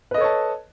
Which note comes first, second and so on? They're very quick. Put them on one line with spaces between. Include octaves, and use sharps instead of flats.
B4 D#5 A4 C#5 A5